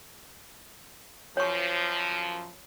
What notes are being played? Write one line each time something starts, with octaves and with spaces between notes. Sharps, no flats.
F#2 F3 C#5 C#6